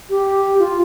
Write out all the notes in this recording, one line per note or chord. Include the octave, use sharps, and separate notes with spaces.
G4
F4